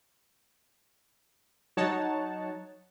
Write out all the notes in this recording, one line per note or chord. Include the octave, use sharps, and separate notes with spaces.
F#3 D#4 C#5 F#5 A5